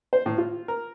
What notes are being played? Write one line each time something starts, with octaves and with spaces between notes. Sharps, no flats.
C5
A2
F4
A#4